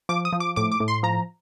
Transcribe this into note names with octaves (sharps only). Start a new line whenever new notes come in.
F3 D6
D#6
F3
D6
A2 D6
D6
A2
C6
F3 A#5